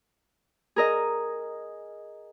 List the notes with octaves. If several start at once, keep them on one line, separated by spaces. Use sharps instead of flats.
G#4 A#4 D#5